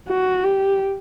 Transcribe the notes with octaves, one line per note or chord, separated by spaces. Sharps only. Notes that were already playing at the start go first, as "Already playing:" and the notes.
F#4
G4